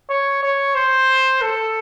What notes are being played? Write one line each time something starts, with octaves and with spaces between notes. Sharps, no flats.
C#5
C#5
C5
A4